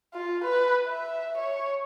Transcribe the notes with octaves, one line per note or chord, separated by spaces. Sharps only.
F4
B4
E5
C#5